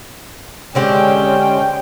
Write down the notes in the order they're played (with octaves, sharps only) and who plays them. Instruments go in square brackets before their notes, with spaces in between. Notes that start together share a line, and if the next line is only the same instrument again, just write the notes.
[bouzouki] D3 C4 G4 [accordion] G#3 C#4 [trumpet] G5